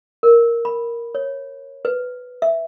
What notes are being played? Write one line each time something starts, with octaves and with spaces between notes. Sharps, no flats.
A#4
B5
C#5
B4
E5